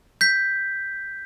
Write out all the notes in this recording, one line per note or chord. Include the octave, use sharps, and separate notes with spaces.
G6 B6